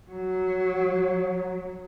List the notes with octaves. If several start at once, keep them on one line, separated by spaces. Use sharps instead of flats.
F#3